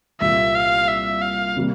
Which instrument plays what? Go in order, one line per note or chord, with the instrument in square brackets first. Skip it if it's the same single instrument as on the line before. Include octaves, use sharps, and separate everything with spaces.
[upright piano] C2 A#2 G3 A#3 F4 [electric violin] E5
[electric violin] F5
E5
F5
[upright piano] C3 G3 A#3